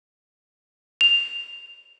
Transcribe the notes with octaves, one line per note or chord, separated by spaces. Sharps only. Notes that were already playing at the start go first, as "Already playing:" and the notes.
F7